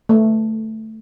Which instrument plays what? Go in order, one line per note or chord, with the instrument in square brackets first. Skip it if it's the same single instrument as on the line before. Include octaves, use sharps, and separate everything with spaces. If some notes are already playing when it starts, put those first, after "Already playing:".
[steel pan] A3